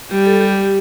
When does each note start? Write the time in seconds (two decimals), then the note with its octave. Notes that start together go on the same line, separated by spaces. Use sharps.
0.11 G3 G4
0.26 A4
0.41 G4